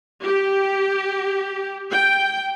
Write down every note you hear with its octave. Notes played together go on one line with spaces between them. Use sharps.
G4
G5